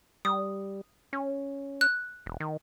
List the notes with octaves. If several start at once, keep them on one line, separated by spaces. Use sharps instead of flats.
G3 D#6
C#4
F#6
E1
D#3